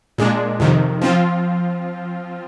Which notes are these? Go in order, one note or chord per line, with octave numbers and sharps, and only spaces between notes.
A#2 G#3 D4
F2 C3 D#3
F3 C4 F4